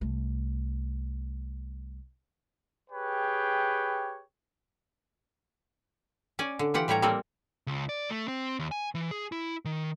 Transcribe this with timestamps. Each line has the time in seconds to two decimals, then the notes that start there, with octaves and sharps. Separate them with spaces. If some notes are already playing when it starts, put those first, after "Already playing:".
0.01 C2 A3
2.90 G4 G#4 B4 C#5 G5
6.39 C#4 D5 G#5
6.59 D3
6.74 E3 F4 G4 F#5 G5
6.88 A2 G3 G4 C#5 A#5
7.02 G3 A#3 C4 A4 A#4
7.67 C#2
7.89 D5
8.10 A3
8.28 C4
8.59 D#2
8.72 G#5
8.95 E3
9.11 G#4
9.32 E4
9.65 D#3